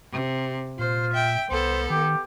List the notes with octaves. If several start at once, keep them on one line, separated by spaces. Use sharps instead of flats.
C3
A#2 F4 C5
E5 G5
C2 B3 A4 C5
D#3 G4